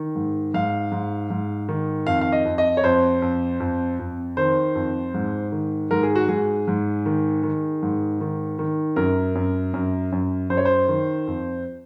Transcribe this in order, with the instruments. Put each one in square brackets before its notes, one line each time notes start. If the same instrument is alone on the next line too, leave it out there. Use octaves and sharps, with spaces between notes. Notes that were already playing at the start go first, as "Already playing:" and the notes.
Already playing: [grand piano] D#3
G#2
G#2 F5
G#2
G#2
D#3
F2 F5
F5
D#5
F2
D#5
C#5
F2 C5
F2
F2
F2
D#3 C5
F2
G#2
D#3
G#2 A#4
G#4
F#4
G#2 G#4
G#2
D#3
D#3
G#2
D#3
D#3
F#2 A#4
F#2
F#2
F#2
F#2 C5
C#5
C5
D#3
F2